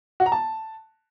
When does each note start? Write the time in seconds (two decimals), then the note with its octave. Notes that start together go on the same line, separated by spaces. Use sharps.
0.20 F#4
0.26 A#5
0.32 A5